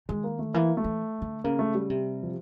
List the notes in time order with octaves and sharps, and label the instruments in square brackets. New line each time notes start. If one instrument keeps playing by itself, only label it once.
[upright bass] D#3 [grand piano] G#3
[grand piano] A#3
A3
[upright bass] E3 [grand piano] A#3
[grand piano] A3
[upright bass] E3
D3
[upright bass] C#3 [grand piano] A#3
[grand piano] A3
G3
[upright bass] C3
[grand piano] F3